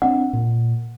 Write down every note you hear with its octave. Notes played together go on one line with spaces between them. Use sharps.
C4 D4 F#5
A#2